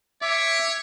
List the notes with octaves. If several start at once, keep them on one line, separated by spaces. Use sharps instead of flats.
C#5 E5 D6